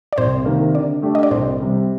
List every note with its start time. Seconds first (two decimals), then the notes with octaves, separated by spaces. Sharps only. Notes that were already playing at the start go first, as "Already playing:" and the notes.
0.13 D5
0.18 C2 C5
0.45 C3 D#3 A#3
0.74 D3 D5
1.02 A3 D4 G4
1.15 D#5
1.23 D5
1.31 C2 C5
1.60 C3 G3